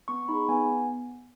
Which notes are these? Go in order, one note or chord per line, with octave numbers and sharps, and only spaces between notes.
B3 C#6
D#4 G#4 B5
B3 G#5